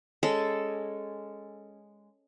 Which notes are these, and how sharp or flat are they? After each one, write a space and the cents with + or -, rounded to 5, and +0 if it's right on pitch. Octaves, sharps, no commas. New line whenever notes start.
G#3 -5 C#4 +0 A4 +0